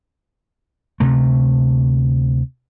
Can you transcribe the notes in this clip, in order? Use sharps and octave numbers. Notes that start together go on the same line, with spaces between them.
D2 C3 A3